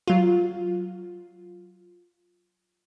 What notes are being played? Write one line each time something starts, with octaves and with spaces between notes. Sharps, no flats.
F#3 F4